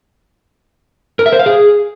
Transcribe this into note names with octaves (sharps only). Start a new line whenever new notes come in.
A#4
E5
C5
F5
G#4